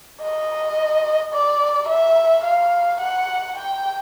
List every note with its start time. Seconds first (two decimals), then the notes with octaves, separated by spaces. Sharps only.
0.23 D#5
1.34 D5
1.89 E5
2.45 F5
3.00 F#5
3.57 G5